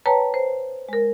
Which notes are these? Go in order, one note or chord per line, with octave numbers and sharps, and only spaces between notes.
B4 C#5 G5 A5 A#5
C5
G#3 A#4